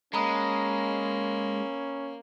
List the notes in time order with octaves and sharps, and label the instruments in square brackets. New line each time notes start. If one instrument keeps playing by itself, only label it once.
[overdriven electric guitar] G#3 [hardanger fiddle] A#3 [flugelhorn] C#4 [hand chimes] A#5 B5 D#6